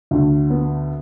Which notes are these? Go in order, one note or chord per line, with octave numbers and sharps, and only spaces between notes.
D2 D3
B3